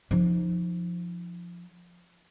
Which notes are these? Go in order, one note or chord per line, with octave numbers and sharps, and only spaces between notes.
F3 D#4